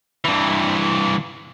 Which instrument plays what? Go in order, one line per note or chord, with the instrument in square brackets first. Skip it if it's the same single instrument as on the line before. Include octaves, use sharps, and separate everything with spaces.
[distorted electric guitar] G2 E3